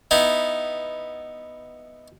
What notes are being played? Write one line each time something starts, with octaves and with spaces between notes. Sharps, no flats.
B3 D#4 E4